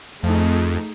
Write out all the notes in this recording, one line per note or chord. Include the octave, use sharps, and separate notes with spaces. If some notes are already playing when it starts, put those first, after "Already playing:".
F2 A3 D#4 G#4